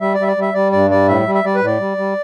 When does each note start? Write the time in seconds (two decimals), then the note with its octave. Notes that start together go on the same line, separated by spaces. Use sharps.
0.01 G3 E5
0.14 D5
0.19 G3 E5
0.28 D5
0.37 G3 E5
0.54 G3 D5
0.72 G2 D5
0.90 G3 D5
1.08 A2 E5
1.26 G3
1.35 E5
1.44 G3 D5
1.55 B4
1.61 A2 D5
1.80 G3
1.97 G3